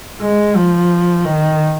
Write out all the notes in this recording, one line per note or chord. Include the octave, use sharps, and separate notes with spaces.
G#3
F3
D#3